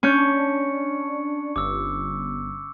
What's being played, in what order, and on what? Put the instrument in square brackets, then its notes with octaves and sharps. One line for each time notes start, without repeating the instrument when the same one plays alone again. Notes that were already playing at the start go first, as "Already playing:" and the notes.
[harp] C#4 G6 [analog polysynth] D4 [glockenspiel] C#6 C#7
[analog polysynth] G1 [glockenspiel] D6 E6